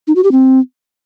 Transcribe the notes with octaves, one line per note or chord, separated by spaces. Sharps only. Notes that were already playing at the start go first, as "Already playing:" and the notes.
D#4
F#4
G4
C4